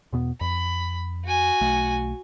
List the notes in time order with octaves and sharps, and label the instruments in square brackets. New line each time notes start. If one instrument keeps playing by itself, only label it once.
[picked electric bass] E2 B2 B3
[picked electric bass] F2 [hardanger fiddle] B5
[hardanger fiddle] F#4 G#5
[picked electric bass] B1 A3